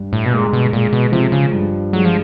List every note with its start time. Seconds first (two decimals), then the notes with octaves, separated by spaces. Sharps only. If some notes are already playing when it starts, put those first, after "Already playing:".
Already playing: G2
0.13 A2
0.26 B2
0.33 A#2 G#3
0.53 B2
0.73 A#2 G#3
0.93 B2
1.12 C3 F3
1.32 C#3
1.52 G2
1.93 F#3 G#3
2.05 F3